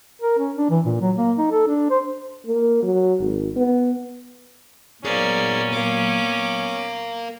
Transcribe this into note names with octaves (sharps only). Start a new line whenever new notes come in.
A#4
C#4
D4
E3
A#2
F#3
A#3
D#4
A4
D4
C5
A#3
F#3
G#1
B3
A#2 F#3 A#3 B3 C#4 G#4 C5 D5
A#4 F5 D6